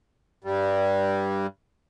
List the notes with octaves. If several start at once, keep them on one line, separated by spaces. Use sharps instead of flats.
G2 G3